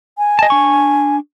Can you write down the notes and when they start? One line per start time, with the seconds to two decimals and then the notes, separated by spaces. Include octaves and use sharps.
0.18 G#5
0.39 D#5 A5
0.50 D4 C#6